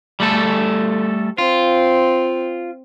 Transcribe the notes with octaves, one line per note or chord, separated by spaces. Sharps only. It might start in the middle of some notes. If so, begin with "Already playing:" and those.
G3 A3 A4
C4 F4